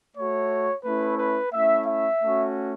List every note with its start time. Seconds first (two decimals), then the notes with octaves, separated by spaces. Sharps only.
0.16 A3 F#4 C#5
0.85 A3 C#4 E4 B4
1.18 B4
1.53 A3 C#4 E4 E5
1.86 E5
2.21 A3 C#4 F#4